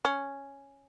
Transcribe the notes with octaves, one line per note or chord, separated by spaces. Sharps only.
C#4